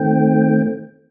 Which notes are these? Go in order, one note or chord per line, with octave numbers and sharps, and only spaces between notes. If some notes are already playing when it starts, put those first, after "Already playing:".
Already playing: D#3 A3 C4 G5